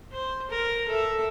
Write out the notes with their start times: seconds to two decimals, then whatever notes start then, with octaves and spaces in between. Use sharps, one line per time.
0.12 C5
0.50 A#4
0.88 A4 E5